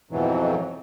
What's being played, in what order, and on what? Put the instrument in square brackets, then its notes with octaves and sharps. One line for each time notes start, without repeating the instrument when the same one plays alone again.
[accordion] F2 G#2 B2 E3 F#3